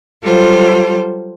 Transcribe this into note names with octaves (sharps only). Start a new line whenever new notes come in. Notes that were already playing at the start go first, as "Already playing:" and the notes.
F#3 G3 F4 A4 C5